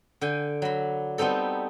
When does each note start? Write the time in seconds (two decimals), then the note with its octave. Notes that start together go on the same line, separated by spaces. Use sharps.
0.21 D3 G5 G#5
0.62 F#3 B5
1.18 G3 B3 C4 D#4 A4